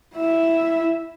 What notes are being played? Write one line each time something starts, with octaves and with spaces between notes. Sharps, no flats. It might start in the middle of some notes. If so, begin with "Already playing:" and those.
E4 E5